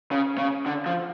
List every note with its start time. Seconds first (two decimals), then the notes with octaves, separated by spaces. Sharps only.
0.12 C#3
0.38 C#3
0.66 D3
0.86 F3